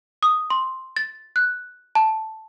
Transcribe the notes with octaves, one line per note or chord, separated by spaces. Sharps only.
D#6
C6
A6
F#6
A5